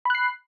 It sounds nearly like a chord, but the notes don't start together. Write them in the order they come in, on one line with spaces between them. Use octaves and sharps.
B5 F#6 C7